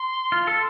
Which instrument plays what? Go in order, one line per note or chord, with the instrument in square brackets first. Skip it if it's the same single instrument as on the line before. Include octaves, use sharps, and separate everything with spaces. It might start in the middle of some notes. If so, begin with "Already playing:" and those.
Already playing: [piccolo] C6
[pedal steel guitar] F4
A4